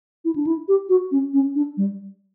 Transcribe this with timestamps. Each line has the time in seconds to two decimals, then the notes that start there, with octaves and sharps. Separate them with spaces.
0.25 E4
0.35 D4
0.47 E4
0.68 G4
0.89 F#4
1.11 C#4
1.33 C#4
1.55 D4
1.77 G3